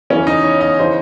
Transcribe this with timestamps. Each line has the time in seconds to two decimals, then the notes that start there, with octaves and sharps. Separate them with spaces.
0.10 E2 C#3 E3 C#4
0.27 D#4
0.44 C#5
0.61 D#5
0.79 C#3 E3 C5